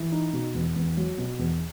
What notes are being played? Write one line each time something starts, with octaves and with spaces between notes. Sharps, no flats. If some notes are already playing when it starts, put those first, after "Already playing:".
Already playing: E3
D#4
B2
E2
E2
F#3
B2
E2